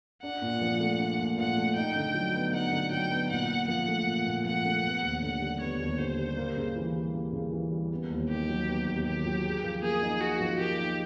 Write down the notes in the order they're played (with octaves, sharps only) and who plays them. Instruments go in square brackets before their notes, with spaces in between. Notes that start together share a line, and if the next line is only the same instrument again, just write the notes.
[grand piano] D4 [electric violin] F#5
[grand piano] A#2
F3
A3
D4
A#2
[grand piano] F3 [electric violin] F#5
[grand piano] A3
[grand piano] D#4 [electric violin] G5
[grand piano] D3
F#3
B3
[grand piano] D#4 [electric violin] F#5
[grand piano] D3
[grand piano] F#3 [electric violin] G5
[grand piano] B3
[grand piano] A#2 [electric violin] F#5
[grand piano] A#2
[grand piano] F3 [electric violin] F#5
[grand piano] A3
A#2
A#2
[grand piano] F3 [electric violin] F#5
[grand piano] A3
B3
D#2
[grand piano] D3 [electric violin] F#5
[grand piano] G3
[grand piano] B3 [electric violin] C#5
[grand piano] D#2
[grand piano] D3 [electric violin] C5
[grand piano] G3
A#3
C#3
E3
G3
A#3
C#3
E3
G3
B3
D#2
[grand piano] D#3 [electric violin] G4
[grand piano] F#3
B3
D#2
[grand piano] D#3 [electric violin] G4
[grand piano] F#3
G#4
F3
[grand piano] A#3 [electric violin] G#4
[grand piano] D#4
[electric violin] F#4 [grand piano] G#4
[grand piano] F3
[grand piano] A#3 [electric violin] G4
[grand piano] D#4